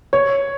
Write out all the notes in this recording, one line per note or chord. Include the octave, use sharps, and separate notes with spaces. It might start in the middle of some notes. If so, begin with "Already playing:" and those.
C#5